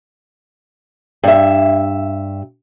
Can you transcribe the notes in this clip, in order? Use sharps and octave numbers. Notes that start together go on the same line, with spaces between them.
G2 E5